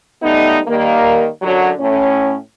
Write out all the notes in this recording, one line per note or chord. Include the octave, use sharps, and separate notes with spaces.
G3 A3 B3 D#4
D#3 G3 A#3
F#2 D3 F#3
A2 C#4